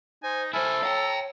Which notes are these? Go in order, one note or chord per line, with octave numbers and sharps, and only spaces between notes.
D#4 C5 G#5
E4 A4 C5 G#5 F6
C#5 F5 G5 A#5